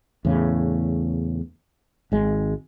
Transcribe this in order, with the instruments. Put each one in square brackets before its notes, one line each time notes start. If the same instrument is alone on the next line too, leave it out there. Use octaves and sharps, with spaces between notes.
[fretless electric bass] E2 A2 C#3
G#1 G#3